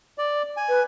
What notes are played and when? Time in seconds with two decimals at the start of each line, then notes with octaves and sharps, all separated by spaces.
0.18 D5
0.57 G#5
0.69 B4